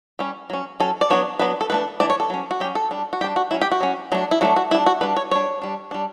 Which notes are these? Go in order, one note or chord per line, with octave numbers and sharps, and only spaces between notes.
G3 C#4
F#3 C#4
F#3 C#4 A4
D5
F#3 B3 D4 C#5
F#3 B3 D4 B4
A4
E3 A3 D4 B4
E3 A3 D4 D5
C#5
A4
F#3 C#4
F#4
F#3 C#4 G4
A4
G3 D4
F#4
G3 D4 G4
F#4
F#3 C#4 E4
G4
F#4
F#3 C#4
F#3 A3 D4
E4
F#3 A3 D4 F#4
F#4
G3 D4 E4
F#4
G3 D4 B4
C#5
G3 D4 C#5
G3 D4
G3 D4